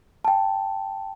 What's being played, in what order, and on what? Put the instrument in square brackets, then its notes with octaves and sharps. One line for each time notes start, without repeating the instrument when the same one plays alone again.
[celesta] G5 A5